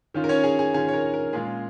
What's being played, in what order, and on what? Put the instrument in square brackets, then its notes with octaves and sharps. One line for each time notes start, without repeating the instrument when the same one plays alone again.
[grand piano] D#3 C#4 F4
A#4
C#4 C#5
G#4
G#4
D#3 C#4 F4 G#4
C#5
A#4
A#4
A#2 G#3 C#4 F4 G#4